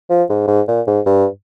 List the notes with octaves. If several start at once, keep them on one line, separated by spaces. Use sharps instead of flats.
F3
G#2
G#2
A#2
G#2
G2